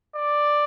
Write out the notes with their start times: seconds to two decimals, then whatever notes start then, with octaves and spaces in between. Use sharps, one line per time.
0.15 D5